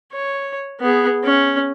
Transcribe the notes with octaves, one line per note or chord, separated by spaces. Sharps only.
C#5
B3 G#4
C#4